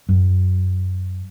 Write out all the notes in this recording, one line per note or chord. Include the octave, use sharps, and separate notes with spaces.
F#2